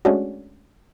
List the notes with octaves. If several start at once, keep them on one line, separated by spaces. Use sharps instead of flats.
G#3 A3 C#4 D4 F#4